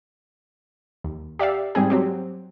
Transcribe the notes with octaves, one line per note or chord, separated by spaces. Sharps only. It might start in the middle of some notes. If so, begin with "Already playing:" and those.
D#2
G4 D5 E5 F5
G#2 G3 C4 G#4
F#3 C4 G4